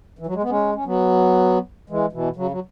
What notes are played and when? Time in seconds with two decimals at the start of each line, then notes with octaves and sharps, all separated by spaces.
0.19 E3
0.26 F#3
0.35 G#3
0.43 B3
0.49 G#3 C#4
0.75 C#4
0.85 F#3 B3
1.90 E3 G#3
2.12 B2 E3
2.36 C#3 F#3
2.51 F#3